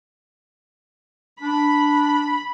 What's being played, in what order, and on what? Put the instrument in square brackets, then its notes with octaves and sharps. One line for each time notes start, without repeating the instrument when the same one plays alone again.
[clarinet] D4 [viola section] B5